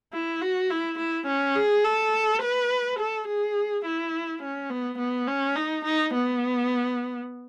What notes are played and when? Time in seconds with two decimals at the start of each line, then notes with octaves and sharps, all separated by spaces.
0.13 E4
0.41 F#4
0.70 E4
0.98 E4
1.26 C#4
1.55 G#4
1.84 A4
2.42 B4
2.99 A4
3.28 G#4
3.85 E4
4.42 C#4
4.70 B3
4.98 B3
5.28 C#4
5.56 D#4
5.85 D#4
6.14 B3